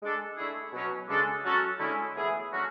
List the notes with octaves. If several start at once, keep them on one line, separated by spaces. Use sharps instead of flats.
G#3 D4 A4
D3 A3 E4 G#4
B2 F#3 C#4
C#3 G#3 D4 A4
F#3 C#4 F#4 A4
D3 G#3 C#4 E4
A2 E3 B3 E4 G#4
D3 F#3 A3 C#4 F#4